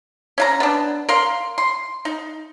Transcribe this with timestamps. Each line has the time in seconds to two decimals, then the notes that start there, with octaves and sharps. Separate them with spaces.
0.38 C#4 F5 A#5
0.60 B3 D4
1.09 A#4 F5 C6
1.58 C6
2.05 D#4